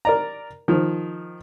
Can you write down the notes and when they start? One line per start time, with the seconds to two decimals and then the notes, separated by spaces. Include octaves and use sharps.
0.05 A#4 D5 A#5
0.68 D#3 F3